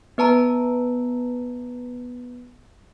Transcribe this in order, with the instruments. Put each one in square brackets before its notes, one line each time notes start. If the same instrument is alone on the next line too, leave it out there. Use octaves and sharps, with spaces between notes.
[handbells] B3 B4 A5 A#5